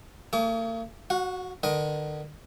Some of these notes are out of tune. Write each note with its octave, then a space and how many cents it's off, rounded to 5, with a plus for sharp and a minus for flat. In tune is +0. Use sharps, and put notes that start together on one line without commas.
A#3 -45 G#4 +30 D6 -45
F#4 +0 F#5 -40
D3 +45 A#4 +45 D#5 +0